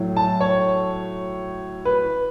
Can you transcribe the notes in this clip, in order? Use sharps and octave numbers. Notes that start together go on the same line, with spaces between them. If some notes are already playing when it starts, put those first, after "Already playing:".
Already playing: A2 F#3
A5
C#5
B4